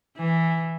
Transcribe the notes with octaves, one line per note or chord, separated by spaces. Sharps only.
E3